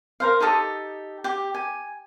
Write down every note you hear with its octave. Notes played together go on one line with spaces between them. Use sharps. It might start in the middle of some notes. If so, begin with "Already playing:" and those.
A#4 C5 F5
D#4 G4 A4 D#6
G4
G#5